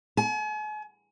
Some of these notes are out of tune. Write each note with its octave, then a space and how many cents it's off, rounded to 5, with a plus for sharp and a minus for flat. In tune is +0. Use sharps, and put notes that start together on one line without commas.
G#5 +40